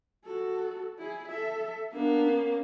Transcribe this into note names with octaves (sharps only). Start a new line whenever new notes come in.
F#4 A4
E4 G#4
A4 E5
A#3 B3 D4
C#4